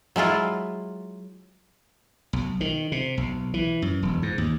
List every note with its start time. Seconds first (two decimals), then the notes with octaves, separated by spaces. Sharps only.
0.16 F#3 G#3 E4 F4
2.33 B1
2.61 D#3
2.92 C3
3.17 B1
3.54 E3
3.82 F#2
4.03 E1
4.22 G#2
4.38 D#2